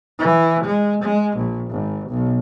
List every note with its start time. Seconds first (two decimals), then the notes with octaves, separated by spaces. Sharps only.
0.19 E3
0.64 G#3
1.02 G#3
1.36 A#1
1.70 G#1
2.09 B1